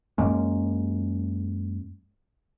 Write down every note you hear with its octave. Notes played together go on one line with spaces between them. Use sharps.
F#2 G#3 A#3 C#4